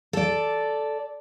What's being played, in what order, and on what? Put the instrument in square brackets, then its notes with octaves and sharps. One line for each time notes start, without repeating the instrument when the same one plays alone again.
[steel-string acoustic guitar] A4 D5